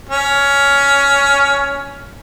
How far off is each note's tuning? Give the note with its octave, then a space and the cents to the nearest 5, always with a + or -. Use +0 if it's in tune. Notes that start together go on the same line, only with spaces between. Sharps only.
C#4 +15